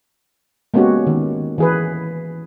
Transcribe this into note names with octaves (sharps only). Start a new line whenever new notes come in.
G#3 A#3 B3 C#4 F#4 G4
D#3
E3 G#4 B4